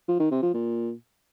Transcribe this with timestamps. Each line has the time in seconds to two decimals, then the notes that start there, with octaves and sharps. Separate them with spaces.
0.08 F3
0.20 D#3
0.31 C3
0.43 F3
0.54 A#2